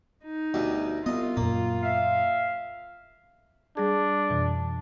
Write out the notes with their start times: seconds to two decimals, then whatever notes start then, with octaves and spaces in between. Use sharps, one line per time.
0.24 D#4
0.54 D2 B2 G3
1.06 C2 B3 F4 D#5
1.37 F#2 A#2 A#3
1.83 E5 F5
3.77 G3 D4 G#4
4.30 F2 B2 E3